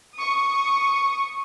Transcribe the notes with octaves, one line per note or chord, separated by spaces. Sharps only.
C#6 D#6